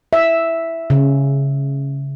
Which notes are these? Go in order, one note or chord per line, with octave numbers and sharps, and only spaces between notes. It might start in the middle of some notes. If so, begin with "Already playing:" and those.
E5
C#3